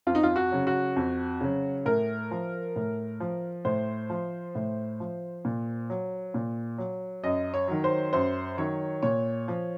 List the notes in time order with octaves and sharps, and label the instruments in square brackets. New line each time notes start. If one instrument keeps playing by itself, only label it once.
[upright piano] F2 F4
D#4
F4
F#4
C#3 F#3
F#4
F2
C#3 F#3
A2 A#4
F3
A2
F3
A2 C5
F3
A2
F3
A#2
F#3
A#2
F#3
F#2 D#5
C#5
D#3 F#3
C5
F#2 C5
D#3 F#3 C#5
A#2 C#5
F3